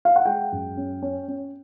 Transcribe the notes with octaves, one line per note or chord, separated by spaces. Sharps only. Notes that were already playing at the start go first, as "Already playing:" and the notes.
F5
F#5
G#3 G5
F#2
C#4
C#4
C#4